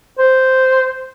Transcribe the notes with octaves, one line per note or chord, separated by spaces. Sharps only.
C5